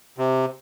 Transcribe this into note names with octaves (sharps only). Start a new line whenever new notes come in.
C3